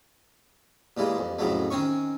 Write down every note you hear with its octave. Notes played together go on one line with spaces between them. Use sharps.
A#2 E3 G3 G#3
F2
F2 A2 C#3 F#3 A3
D#3 C4 C#4 C#6